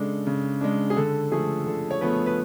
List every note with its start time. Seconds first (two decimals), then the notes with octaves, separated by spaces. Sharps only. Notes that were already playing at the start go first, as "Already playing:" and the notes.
Already playing: C#3 G#3 D4 A4
0.27 C#3
0.61 G#3 D4
0.90 G#4
0.96 D3 A4
1.32 F3 A3 G#4
1.66 D3 A4
1.91 C#5
2.01 F3 A3 B3 B4
2.26 B4